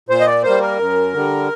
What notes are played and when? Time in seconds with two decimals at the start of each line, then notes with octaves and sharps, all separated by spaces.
0.09 A#2 C5
0.20 D#5
0.27 D5
0.43 G3 A#3 C5
0.61 A#4
0.79 F#2
1.14 D3 G3